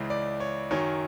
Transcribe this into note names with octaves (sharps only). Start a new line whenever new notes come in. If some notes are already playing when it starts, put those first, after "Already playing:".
Already playing: C#2 C#3 E3
D5
C#5
F#2 D#3 F#3 C#5